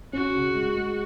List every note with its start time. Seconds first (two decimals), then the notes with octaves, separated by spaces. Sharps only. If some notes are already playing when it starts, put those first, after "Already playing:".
0.13 C#4 F#4
0.34 C#3
0.55 G#3
0.76 G#3